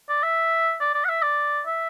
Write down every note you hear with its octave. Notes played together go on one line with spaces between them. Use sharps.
D5
E5
D5
D5
F#5
E5
D5
E5